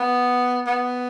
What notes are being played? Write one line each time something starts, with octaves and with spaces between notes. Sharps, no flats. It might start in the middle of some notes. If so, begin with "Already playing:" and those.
Already playing: B3
B3